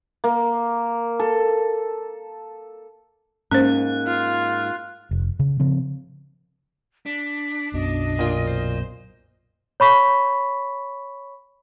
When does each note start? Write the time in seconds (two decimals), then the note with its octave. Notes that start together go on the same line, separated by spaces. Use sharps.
0.24 A#3
1.20 A4
3.51 G#2 A#3 C#4 C5 F#6
4.07 F4
5.11 F1
5.39 C#3
5.60 C#3 F3 C4
7.06 D4 B6
7.74 B1 F#2 B2 D#5
8.19 A#2 F4
8.47 C5
9.80 C#5 B5 C#6 B6